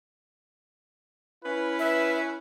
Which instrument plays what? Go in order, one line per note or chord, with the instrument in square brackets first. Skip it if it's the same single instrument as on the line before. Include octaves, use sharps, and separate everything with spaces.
[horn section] C#4 E4 B4
[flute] E5